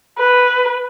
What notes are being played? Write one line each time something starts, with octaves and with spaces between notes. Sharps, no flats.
B4